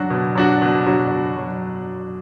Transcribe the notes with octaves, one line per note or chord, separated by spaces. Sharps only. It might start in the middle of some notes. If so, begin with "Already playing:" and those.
Already playing: F#3 D4 F#4
B2
F#3 D4 F#4
B2
F#3 D4 F#4
B2
F#3